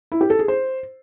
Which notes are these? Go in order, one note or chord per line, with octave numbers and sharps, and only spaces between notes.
E4
G4
A4
G#4
C5